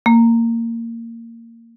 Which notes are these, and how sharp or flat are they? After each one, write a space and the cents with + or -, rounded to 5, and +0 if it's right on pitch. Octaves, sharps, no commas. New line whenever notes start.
A#3 -20